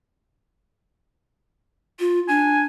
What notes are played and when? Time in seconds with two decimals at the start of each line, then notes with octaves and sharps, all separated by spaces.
1.99 F4
2.28 D4 G#5